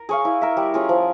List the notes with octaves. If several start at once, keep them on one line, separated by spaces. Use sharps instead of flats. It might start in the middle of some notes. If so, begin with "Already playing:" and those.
Already playing: A#4
G#4 C#5 F5
E4
A#4 E5
G3
C#4 F4 G#4
F3